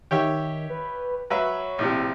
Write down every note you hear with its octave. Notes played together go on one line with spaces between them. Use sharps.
D#3 G4 C#5 E5
B4
F#3 B4 C#5 E5
A#1 A2 C3